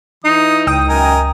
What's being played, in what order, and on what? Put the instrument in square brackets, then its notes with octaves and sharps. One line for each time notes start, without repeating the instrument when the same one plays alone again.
[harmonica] E3 D#6 [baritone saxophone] D#4
[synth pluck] C#2 G5 D#6
[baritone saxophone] F#2 [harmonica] A#4 D#5 G#5